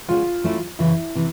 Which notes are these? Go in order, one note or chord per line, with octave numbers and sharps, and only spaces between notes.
G#3 C#4 F4 F#4
F#3 A3 C#4 E4
F#2 C#3 E3 E4
C3 E3